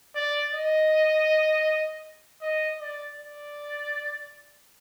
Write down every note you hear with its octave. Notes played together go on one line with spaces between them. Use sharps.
D5
D#5
D#5
D5
D5